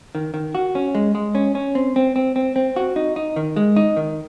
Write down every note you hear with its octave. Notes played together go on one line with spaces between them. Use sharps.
D#3
D#3
F#4
C#4
G#3
G#3
C#4
C#4
C4
C4
C4
C4
C4
F#4
D#4
D#4
D#3
G#3
D#4
D#3